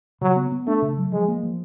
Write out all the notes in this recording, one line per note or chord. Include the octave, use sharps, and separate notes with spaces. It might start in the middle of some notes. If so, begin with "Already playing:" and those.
C#3 F#3
B3
B3
A3 D4
C#3
F#3
F3 G#3
A#3
F3